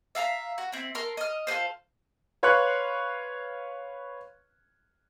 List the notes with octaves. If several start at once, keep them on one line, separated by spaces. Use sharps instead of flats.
E5 F5 A5 A#5
F#4
C4 E4
A4 A#4 C6
D#5 F6
F4 A4 B4 C5
B4 C#5 F5 C6 C#6 F#6